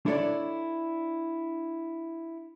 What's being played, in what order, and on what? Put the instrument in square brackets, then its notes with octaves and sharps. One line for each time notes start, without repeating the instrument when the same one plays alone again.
[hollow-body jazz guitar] D4 E4 A4 C#5 D5